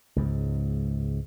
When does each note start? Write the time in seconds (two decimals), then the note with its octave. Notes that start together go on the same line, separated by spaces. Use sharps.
0.16 C#2 G#2